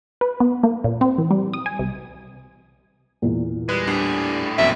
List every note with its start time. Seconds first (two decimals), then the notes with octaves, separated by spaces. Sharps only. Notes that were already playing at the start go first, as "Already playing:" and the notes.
0.21 B4
0.40 B3
0.63 A#3
0.84 A#2
1.01 C4
1.18 E3
1.31 G3
1.54 D#6
1.66 G#5
1.79 C2
3.22 E2 A#2
3.69 G3 G#3 B4
3.87 A2 G3 D4 G#4
4.58 A#1 F#2 B2 E5